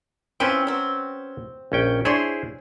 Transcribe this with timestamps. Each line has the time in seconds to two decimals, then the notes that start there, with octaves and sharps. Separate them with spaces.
0.40 E3 F3 C4 C#4 B4 G5
0.67 F#3 C4
1.72 A#1 C#4 G5
2.05 D4 E4 G#4 C5 C#5 C6